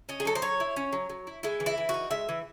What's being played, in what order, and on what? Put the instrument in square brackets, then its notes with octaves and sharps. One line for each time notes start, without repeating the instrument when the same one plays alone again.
[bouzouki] C#4 D#5
G#4
F#3 A4
C5
F#3 C#5
E4
C#4
F#3
F#3
E4
G#3 E4
E3
E4
E3
F#4
D#4
G#3 E5
E3